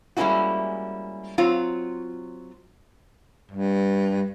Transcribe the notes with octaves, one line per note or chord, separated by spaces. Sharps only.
G3 G#3 A#3 C#4 E4 F#4
F#3 C4 F4 C#5
G2